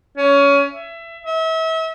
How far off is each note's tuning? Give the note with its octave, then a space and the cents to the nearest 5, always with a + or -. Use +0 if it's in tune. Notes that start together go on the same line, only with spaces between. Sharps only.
C#4 +20
E5 +20
E5 -35